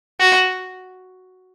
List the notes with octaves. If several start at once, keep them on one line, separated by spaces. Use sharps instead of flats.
F#4